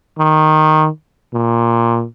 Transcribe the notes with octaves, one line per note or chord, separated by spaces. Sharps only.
D#3
A#2